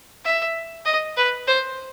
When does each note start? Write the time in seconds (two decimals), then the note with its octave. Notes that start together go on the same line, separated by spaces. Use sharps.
0.24 E5
0.85 D#5
1.17 B4
1.47 C5